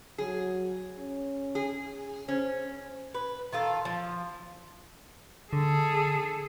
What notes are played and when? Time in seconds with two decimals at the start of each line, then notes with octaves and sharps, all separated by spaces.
0.18 F#3 G#4
0.99 C#4
1.55 G#4
2.29 C#4 C5
3.14 B4
3.52 D#3 F4 A4
3.85 F3
5.53 D3 G#4 A4